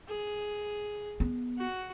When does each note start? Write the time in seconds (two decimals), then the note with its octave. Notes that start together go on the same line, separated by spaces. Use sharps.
0.08 G#4
1.20 B3
1.58 F#4